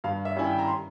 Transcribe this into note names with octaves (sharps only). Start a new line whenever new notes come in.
G2 F5
E5
G3 C#4 E4 G#5
G5
A#5
C6